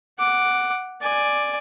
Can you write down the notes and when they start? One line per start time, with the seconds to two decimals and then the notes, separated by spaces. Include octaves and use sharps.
0.19 F#5 D6
1.01 D5 G#5